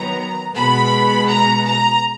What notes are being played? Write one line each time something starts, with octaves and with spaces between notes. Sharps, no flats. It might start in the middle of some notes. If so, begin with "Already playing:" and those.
Already playing: D#3 F#3 B3 A#5
B2 G#3 B3 B5
A#5
A#5